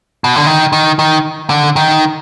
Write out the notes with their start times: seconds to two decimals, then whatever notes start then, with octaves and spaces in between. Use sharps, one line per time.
0.24 B2
0.36 D3
0.47 D#3
0.73 D#3
0.99 D#3
1.50 D3
1.76 D#3